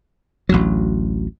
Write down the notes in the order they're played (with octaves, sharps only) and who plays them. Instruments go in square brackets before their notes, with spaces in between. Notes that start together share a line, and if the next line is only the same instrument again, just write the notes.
[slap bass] A1 D2 F#3